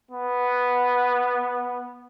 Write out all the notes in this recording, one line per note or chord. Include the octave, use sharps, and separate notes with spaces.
B3